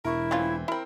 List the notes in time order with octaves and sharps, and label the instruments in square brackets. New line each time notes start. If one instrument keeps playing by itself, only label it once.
[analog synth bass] E1 [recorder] E4 [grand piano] A#4 C#6
[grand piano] E3 C4 [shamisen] A3 C#4 F4
[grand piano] C4 A#4 [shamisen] E4 B5